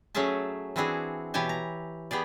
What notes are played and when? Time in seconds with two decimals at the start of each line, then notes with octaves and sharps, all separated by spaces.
0.15 F#3 A3 C#4 G#4 E5 A5
0.76 E3 C4 D4 E4 F#4 G#4
1.34 B2 E3 G4 C#5 G#5 A5
1.49 A#5
2.11 B3 G4 G#4 D5